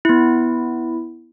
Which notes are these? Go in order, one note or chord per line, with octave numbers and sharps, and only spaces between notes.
B3 E4